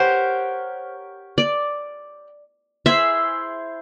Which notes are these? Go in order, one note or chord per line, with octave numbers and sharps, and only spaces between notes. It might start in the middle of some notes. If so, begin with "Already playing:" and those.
Already playing: G4 A#4 C5 C#5 F#5
D5
E4 G#4 C5 E5